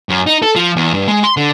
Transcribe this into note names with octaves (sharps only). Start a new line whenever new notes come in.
F#2
D#4
A4
F3
E2
G2
G#3
C6
D3